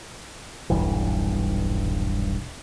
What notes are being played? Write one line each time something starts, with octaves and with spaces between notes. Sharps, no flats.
D#1 B1 G2 E3